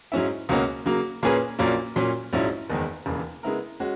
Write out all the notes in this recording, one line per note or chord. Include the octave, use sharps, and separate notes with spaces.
G#2 F#3 C#4 E4
C#2 B2 A#3 C#4 F#4
C#3 F#3 A#3
A#2 A#3 C#4 G#4 B4
A#1 A#2 F#3 A#3 C#4
A#2 F#3 C#4
A#1 G#2 F#3 C#4 E4
F#1 E2 D#3 G#3
E1 D#2 C#3 E3
C#3 G#3 B3 E4 A#4
G#3 C#4 F#4